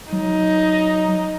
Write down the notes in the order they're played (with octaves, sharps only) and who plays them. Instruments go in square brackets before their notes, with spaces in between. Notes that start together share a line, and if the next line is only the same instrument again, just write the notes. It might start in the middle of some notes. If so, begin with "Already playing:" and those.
[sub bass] F#3 [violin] D#4